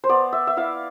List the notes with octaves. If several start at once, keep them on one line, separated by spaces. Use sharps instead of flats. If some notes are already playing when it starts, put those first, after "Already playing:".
C5
B3 D5
E5
E5
E4 F5